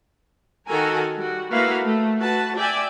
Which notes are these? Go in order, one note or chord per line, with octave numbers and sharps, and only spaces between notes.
D#3 F#4 A4 A#4 G#5
G3 F#4
A3 A#3 E4 F#4 B4 F5
A3
F#4 B4 A5
D5 E5 G5 G#5